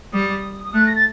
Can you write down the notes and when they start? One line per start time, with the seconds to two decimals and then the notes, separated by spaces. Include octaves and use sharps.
0.13 G3 D#6
0.64 D#6
0.74 A3 F#6
0.87 A#6
0.96 A6